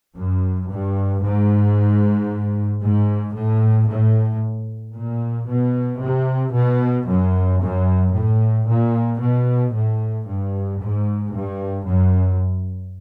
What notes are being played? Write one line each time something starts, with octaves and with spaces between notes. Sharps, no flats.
F#2
G2
G#2
G#2
A2
A2
A#2
B2
C3
B2
F#2
F#2
A2
A#2
B2
A2
G2
G#2
G2
F#2